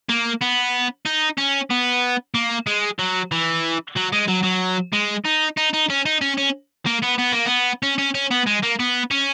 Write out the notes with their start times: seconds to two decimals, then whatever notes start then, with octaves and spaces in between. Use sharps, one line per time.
0.10 A#3
0.42 B3
1.06 D#4
1.38 C#4
1.70 B3
2.35 A#3
2.67 G#3
2.99 F#3
3.32 E3
3.96 F#3
4.12 G#3
4.28 F#3
4.44 F#3
4.93 G#3
5.25 D#4
5.57 D#4
5.73 D#4
5.90 C#4
6.06 D#4
6.21 C#4
6.37 C#4
6.86 A#3
7.02 B3
7.18 B3
7.32 A#3
7.46 B3
7.83 C#4
7.98 C#4
8.14 C#4
8.31 B3
8.46 G#3
8.62 A#3
8.79 B3
9.11 C#4